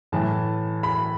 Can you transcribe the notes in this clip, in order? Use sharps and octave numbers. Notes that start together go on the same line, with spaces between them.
A2 E3 A5
B5